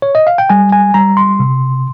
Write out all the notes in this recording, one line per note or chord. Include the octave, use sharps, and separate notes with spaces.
C#5
D#5
F5
G5
G3 G#5
G#5
G3 A#5
C6
C3